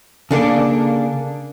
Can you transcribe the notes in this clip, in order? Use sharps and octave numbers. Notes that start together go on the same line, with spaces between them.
C#3 A#3 D4 A4